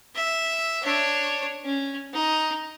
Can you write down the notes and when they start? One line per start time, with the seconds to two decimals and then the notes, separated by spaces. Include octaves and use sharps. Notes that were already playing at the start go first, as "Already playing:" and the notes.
0.15 E5
0.83 D4 C#5
1.65 C#4
2.14 D#4